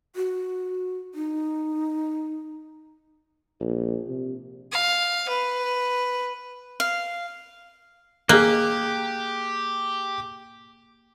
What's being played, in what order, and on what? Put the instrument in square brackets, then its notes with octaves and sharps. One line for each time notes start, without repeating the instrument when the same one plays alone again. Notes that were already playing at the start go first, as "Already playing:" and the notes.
[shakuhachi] F#4
D#4
[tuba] A#1
C3
[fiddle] F5
B4
[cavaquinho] F5
[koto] A#3 [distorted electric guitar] G4 [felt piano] G#4 F#6